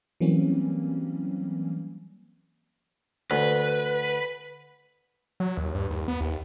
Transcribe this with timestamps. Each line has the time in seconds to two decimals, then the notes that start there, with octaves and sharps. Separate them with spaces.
0.20 E3 F#3 G3 A#3 C4 C#4
3.31 D2 B4
5.40 F#3
5.57 D#2
5.74 G2
5.90 D#2
6.08 B3
6.21 D#2